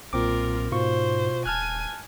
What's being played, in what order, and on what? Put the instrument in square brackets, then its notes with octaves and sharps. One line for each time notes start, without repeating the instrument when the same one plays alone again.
[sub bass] B1 [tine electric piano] A#2 C4 D6 [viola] F4 A#4
[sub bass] G#2 [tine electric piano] B2 F4 C#6 [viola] C5
[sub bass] D#1 [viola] G#5 [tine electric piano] A5 F6 F#6